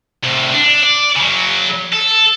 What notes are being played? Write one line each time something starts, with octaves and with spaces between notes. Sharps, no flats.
C2 A2
D4
D5
C#3 F#3
A4